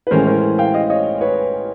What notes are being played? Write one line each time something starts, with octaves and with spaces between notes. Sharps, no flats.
B4
A2 E3 G#3 C#4 A#4 C5
A#4 C5
F5 G5
D#5 F5
C#5 D#5
B4 C#5